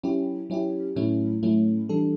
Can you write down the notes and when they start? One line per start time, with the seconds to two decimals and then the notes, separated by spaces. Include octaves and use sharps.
0.03 F#3 C#4 E4 G4
0.50 F#3 C#4 E4 G4
0.96 A2 F#3 A3 C#4 E4
1.42 A2 F#3 A3 C#4 E4
1.89 E3 G3 D4 A4